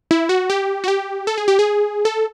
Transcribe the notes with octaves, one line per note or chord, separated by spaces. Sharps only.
E4
F#4
G4
F#4
G4
A4
G#4
G4
G#4
A4